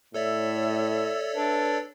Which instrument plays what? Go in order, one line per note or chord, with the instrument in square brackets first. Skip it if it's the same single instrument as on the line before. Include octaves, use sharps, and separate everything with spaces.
[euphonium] A2 [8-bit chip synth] A4 C#5 D5 [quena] E5
[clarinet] D4 [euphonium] B4